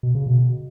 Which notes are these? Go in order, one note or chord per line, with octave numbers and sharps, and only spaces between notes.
B2
C#3
B2